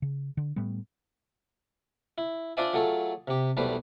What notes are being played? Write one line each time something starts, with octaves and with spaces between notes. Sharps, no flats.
C#3
D3
A2 G3 A3 B3
E4
D4 F4 C5 D5 E5 G#5
F#3 A3 F4 G#4 A4
C3 G4
B1 E2 G3 A3 B4 C5